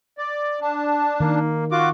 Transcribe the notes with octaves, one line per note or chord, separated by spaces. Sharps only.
D5
D4 A5
D#3 A#3
F4 F#4 C#6 D6